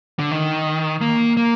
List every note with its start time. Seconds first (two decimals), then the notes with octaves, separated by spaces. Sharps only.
0.19 D3
0.31 D#3
1.01 A#3
1.37 A#3